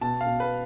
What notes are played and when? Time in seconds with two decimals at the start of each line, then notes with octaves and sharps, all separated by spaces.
0.01 B2 A5
0.21 F5
0.27 B2
0.40 B4